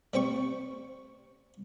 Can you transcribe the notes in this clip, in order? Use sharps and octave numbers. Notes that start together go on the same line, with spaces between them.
G3 C4 G5 C#6